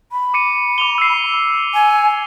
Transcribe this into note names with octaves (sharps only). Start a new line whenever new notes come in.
B5
D6 C#7 D#7
D6 F7 G7
E6 C7
G#5